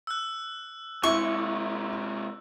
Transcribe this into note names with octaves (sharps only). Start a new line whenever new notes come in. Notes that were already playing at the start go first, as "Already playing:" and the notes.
E6 F#6
C3 G#3 E4 C#6